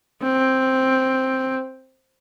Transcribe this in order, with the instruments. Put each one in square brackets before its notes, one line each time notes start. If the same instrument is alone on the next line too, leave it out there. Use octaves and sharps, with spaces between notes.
[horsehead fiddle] C4